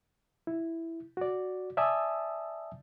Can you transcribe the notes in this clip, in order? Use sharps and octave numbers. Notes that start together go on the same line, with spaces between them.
E4
F#4 D5
D5 E5 G#5 A5 D#6 E6